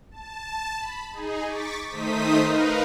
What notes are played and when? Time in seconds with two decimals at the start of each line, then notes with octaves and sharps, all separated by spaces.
0.11 A5
0.78 B5
1.12 D#4 G#4
1.46 C#6 D6 A6 B6
1.88 D#3 A3 D#4 C5 D#6 B6
2.40 D#4 A#4 B4 D#5 F5